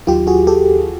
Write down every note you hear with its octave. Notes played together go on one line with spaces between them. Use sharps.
D#2 D#3 F#3 F4 G4
F#4 G#4
G4 A4